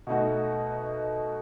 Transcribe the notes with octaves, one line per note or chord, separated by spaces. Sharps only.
B2 A3 D#4 F#4